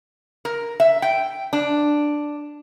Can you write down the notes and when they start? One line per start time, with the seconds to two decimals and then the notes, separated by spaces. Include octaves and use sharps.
0.45 A#4
0.80 E5
1.02 G5
1.53 D4